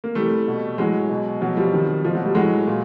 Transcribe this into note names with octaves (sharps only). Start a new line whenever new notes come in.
A#3
C3 E3 G3 A3
B2
A2 E3 F#3 G#3
B2
B2 F#3
F3 G3
C3 D#3
B2 F3
F#3
G3
A2 E3 F#3 G#3
A#2